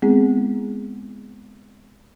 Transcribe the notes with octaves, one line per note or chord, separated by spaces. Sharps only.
G#3 B3 C4 E4 G#4